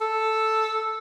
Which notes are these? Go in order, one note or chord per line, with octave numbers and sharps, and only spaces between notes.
A4